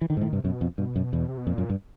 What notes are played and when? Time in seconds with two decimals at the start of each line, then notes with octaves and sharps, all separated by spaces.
0.01 E3
0.10 D3 D#3
0.17 G#2
0.21 A2 D#3
0.32 G2 C3
0.44 F#2 B2
0.61 F2
0.78 G2 B2
0.96 F#2
1.13 E2
1.28 C3
1.38 B2
1.46 F2 A#2
1.58 F#2
1.70 G2